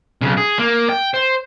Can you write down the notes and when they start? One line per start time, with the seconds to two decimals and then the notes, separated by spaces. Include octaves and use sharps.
0.21 B1 C#3
0.37 G#4
0.59 A#3
0.89 G5
1.14 C5